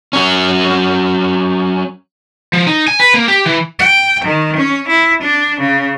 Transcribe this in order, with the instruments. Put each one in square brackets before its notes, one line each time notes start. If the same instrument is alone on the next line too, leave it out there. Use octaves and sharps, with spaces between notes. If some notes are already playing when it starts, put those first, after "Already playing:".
[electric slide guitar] F#3 C#4
[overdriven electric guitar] F3
D#4
G#5
B4
A#3
G4
E3
[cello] G5
D#3
C#4
E4
D4
C#3